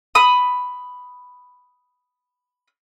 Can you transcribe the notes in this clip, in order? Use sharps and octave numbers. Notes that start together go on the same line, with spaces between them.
B5 D#6